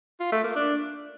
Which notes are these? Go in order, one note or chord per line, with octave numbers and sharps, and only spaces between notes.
F4
A3
A#3
D4